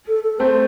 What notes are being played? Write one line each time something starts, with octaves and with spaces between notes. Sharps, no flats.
A4
A4
A3 C4 C5